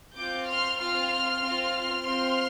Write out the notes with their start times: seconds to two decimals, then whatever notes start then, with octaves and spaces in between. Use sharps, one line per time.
0.16 C4 F4 D6 G6
0.48 C6 F6
0.79 C4 F4 C6 F6
1.42 C4 F4
2.05 C4 F4 C6 F6